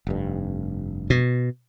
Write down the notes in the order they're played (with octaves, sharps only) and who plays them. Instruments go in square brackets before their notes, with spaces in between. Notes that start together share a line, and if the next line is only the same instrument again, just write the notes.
[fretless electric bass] F1 G2
[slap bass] B2